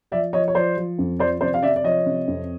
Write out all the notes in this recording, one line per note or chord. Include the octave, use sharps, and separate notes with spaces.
F3 D5 E5
F3 C#5 D#5
C#5
F3 C5 D5
F3
F2
F3 C5 D5
C3 C5 D5
F5
C3 D5 E5
D5
F3 C#5 D#5
C3
F2